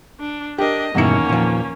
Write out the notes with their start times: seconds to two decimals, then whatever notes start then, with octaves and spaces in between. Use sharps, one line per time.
0.19 D4
0.58 D4 G4 A#4 D#5
0.95 E2 G2 B2 D#3 A#3 C#4 E4 C#7
1.29 A#2 F3